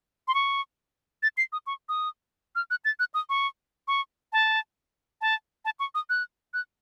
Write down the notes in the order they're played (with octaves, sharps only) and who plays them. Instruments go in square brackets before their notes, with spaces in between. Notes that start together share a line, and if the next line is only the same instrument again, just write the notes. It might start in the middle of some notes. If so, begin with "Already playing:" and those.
[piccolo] C6
C#6
A6
C7
D#6
C#6
D#6
F6
F#6
A6
F#6
D#6
C#6
C#6
A5
A5
A5
C#6
D#6
F#6
F#6